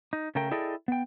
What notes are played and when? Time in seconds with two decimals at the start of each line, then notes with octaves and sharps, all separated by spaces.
0.13 D#4
0.35 C#3 A3 A#4 G5
0.51 E4 G#4 A4 D5 D#5 G5
0.88 B3 G5